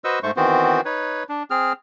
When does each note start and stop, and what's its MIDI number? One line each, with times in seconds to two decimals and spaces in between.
0.04 0.19 66
0.04 0.19 71
0.04 0.19 72
0.04 0.19 75
0.04 0.19 85
0.04 0.19 88
0.23 0.31 44
0.23 0.31 57
0.23 0.31 72
0.23 0.31 85
0.36 0.81 51
0.36 0.81 52
0.36 0.81 59
0.36 0.81 60
0.36 0.81 66
0.36 0.81 72
0.85 1.23 63
0.85 1.23 71
0.85 1.23 73
1.29 1.43 62
1.50 1.73 60
1.50 1.73 68
1.50 1.73 89